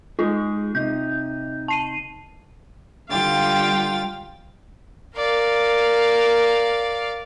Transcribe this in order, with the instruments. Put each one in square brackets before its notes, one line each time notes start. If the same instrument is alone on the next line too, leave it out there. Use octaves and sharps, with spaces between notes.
[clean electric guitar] G#3 D#4 G#4 [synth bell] F4
[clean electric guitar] C3 D#4 [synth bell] G6
[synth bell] A5 C7 D#7
[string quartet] D3 G3 F4 F5 G5 A6
[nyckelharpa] A#4 [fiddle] D5 F5